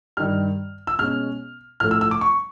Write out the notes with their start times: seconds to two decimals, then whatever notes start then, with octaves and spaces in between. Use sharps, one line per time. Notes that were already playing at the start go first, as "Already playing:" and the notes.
0.17 G2 D#3 G3 F6
0.87 E6
0.99 B2 G#3 C#4 F6
1.80 A2 F3 A3 F6
1.91 E6
2.01 E6
2.11 D6
2.21 C#6